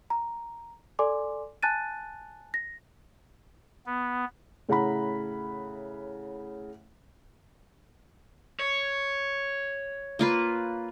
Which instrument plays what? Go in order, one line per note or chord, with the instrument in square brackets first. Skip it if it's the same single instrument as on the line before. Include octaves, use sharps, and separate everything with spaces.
[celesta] A#5
A4 D5 G#5 C6 D6
G#5 A5 F#6 A6 D#7
A#6
[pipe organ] B3
[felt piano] A2 C#3 E4 F#5 A#5 B5
[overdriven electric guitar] C#5
[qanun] A#3 F4 B4